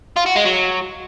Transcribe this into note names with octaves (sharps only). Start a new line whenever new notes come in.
F4
F#4
G#3
F#3